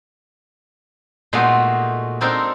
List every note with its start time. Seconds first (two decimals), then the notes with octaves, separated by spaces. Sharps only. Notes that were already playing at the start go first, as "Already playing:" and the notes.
1.33 A#2 G#3 A3 B3 D#4 F#4
2.21 C4 D4 D#4 A4 A#4 C5